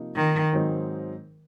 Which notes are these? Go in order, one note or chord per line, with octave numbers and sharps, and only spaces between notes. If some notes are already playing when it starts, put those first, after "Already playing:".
Already playing: C3 F3 A#3 D#4
D#3
G#2 F#3 C4 D#4